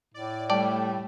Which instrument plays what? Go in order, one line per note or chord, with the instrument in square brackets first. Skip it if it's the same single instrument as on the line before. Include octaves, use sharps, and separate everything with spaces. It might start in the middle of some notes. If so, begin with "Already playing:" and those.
[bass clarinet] A2 [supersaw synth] D5
[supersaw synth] G3 A3 [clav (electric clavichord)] D5 [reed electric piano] G5 A5 D6